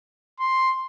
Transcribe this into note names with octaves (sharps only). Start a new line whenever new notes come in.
C6